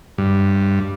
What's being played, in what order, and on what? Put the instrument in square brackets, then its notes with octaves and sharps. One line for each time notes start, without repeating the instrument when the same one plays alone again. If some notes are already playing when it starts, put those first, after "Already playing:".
[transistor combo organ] G2